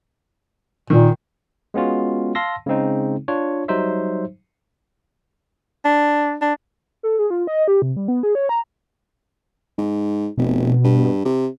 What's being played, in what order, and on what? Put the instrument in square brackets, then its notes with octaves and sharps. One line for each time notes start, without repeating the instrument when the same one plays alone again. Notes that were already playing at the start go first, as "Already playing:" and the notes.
[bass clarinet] A#2 [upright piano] D#3
[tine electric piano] G#3 B3 C#4 F4 F#4
F5 A5 C6 E6 A#6
C#3 G#3 C4 D#4
D4 F4 C#5
F#3 G3 D#4 C5 E5
[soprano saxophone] D4
D4
[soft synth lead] A4
G#4
F4
D#5
G4
C3
G3
B3
G#4
C#5
A#5
[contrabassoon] G#2
[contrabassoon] F1 [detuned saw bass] B2
[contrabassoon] G2
C3